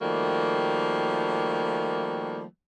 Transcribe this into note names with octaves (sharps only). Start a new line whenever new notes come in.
D#3 F3 G3 A3 A#3 F#4